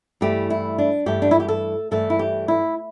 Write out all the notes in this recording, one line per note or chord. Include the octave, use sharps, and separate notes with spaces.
G2 E3 A3 G4
E4
D4
G2 E3 A3 G4
D4
E4
G4
A4
G2 E3 A3 A4
E4
G4
E4